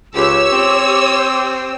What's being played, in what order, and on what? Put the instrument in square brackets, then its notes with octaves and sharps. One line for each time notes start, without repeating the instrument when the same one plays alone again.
[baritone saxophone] C#2 [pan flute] G4 [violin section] C#5 E6
[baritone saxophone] C4